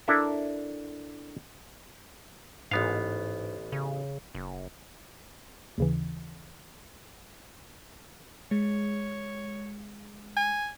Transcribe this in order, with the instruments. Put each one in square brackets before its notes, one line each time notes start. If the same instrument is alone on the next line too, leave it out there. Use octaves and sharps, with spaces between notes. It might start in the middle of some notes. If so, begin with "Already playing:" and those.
[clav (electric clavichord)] D4 E4 A4 A#4 E5
[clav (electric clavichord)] A1 B3 F5 [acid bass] G#2
[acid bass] C#3
F#1
[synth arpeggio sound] D#2 C#3 E3
[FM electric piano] G#3 [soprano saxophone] C#5
[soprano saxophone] G#5